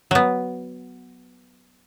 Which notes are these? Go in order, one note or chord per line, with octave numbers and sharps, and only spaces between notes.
F#3 B3